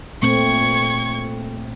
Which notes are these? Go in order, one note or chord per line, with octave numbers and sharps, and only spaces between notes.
A#2 A3 C4 C#6 G#6